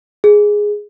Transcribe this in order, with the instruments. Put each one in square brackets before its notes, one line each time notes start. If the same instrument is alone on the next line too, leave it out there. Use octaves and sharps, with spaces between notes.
[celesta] G#4